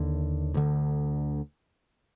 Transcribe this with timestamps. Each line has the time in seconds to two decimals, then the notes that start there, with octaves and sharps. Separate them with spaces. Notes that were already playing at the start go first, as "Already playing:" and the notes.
Already playing: D#2 D3
0.54 D2 D3